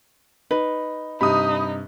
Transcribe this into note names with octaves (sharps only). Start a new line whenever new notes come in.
D#4 B4
G2 C3 D#4 B5 D#6